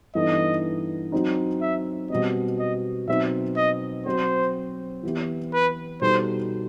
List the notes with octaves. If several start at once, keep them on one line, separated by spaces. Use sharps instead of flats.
G2 E3 B3 D#4 A4 D#5
F#3 C4 D#4
E5
B2 G3 C4 D#5
D#5
B2 F#3 C4 D#4 E5
D#5
F#3 C4 F#4 C5
E3 B3 E4 G4
B4
B2 G3 D#4 A4 C5